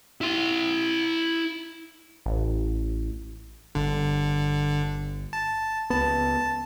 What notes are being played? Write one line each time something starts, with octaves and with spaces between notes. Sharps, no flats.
E4 C6
A1
G1 D3
A5
C#2 B3 A5